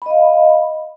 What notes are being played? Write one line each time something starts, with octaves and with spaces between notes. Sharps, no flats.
D#5 F5 B5